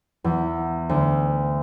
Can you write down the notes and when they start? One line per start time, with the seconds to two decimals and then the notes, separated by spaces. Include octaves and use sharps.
0.24 E2
0.89 D2